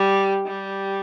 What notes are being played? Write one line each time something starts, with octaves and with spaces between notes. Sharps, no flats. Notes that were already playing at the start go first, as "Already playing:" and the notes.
Already playing: G3
G3